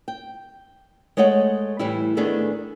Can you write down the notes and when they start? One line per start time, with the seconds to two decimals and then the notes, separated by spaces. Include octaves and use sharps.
0.08 G5
1.17 G#3 A3 C#5 D#5 F#5
1.79 A2 E3 G3 E4
2.17 D#3 A3 B3 D4 G#4